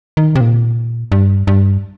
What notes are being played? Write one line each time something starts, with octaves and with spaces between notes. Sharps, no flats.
D#3
C3
A#2
G2
G2